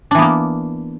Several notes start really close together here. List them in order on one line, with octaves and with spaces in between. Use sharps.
D4 E3 B3 A#3